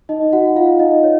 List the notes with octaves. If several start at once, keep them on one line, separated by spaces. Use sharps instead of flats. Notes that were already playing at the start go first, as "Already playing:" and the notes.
D#4 D#5
F#4 F#5
F4 F5
D#4 D#5
C#5